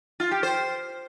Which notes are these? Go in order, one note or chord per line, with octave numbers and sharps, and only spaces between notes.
F4
G4
C5